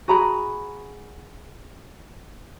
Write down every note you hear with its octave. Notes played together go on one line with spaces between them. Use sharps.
F#4 G#4 A#5 B5